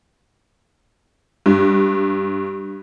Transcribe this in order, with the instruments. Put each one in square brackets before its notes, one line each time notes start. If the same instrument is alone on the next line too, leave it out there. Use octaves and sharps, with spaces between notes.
[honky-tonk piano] G2